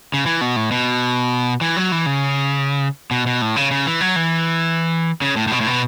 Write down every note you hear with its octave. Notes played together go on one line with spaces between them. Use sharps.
C#3
E3
B2
A2
B2
E3
F#3
E3
C#3
B2
B2
A2
C#3
C#3
E3
F#3
E3
C#3
A2
A2
B2
A2
B2